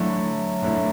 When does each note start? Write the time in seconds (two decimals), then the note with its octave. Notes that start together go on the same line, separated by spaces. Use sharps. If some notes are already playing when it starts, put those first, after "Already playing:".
Already playing: D3 F#3 A3 E4
0.62 D3 A3 E4